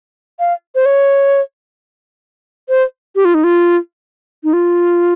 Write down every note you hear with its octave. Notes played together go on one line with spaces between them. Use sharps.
F5
C5
C#5
C5
G4
F4
D#4
F4
D#4
F4